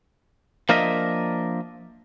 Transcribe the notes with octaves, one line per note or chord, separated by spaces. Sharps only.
F3 A#3 D4 A#4 D#5 E5